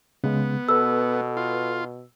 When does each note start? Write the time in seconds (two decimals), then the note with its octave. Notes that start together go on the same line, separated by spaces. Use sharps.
0.24 C#3 G#3 B3
0.68 B2 A4 B4 E6
1.37 F4